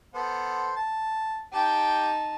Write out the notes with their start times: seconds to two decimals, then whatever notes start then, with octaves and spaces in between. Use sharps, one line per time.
0.15 B3 A4 C5
0.76 A5
1.53 D#4 G4 G5 A5